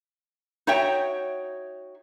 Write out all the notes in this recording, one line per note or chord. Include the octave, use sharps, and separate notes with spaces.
D#4 F#4 C#5 E5 G5